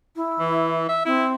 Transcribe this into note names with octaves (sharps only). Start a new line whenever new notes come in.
E4
E3
E5
C4 E4